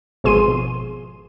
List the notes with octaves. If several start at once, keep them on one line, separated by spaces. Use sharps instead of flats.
G#1 B2 F3 G#4 C6 D#7